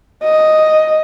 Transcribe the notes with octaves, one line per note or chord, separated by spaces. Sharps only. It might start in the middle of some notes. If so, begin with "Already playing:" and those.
D#5